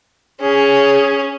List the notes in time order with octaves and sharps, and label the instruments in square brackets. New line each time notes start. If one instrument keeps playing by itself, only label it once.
[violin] C#4 [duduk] G#4